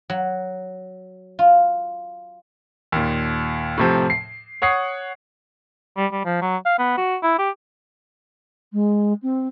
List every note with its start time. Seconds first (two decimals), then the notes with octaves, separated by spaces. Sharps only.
0.10 F#3
1.39 F4
2.92 D#2 A#2
3.78 A2 C3 F3
4.10 C7
4.62 C#5 F#5 D#6 C7
5.97 G3
6.12 G3
6.24 F3
6.42 F#3
6.65 F5
6.79 B3
6.97 F#4
7.23 E4
7.39 G4
8.73 G#3
9.22 C4